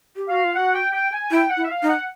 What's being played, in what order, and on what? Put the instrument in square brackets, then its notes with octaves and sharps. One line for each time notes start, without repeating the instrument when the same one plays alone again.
[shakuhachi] G4
[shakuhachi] F#4 [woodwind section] F5
[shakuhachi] F4
[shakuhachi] F#4 [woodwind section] F#5
[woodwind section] G5
G5
G#5
[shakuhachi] E4 [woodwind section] G5
[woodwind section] F#5
[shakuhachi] E4
[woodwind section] E5
F5
[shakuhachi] D#4
[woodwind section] F#5